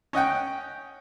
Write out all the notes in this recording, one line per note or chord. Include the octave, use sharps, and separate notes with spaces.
C#4 D#5 F#5 G5